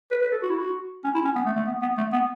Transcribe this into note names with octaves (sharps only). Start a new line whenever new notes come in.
B4
B4
A4
F#4
E4
F#4
C#4
E4
C#4
B3
A3
A3
B3
B3
A3
B3